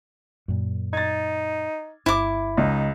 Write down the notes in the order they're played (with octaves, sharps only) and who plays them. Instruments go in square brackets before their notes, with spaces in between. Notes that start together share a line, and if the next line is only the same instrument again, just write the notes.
[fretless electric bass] F#2 A#2
[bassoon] D#4 [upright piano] G#6 A6
[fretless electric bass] G1 [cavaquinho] E4 D6
[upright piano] C#2 [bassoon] D#4